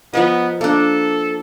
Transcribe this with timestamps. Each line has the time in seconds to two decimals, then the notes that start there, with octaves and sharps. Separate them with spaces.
0.13 F3 B3 A#4 D#5
0.61 A#3 D4 A4